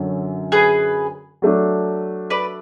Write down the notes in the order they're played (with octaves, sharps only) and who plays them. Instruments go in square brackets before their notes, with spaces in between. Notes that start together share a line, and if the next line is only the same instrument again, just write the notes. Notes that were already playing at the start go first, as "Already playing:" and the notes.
Already playing: [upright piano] F#2 D3 F#3 C#4
[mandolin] G#4 B4
[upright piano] F#3 A3 D4
[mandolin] B4 D5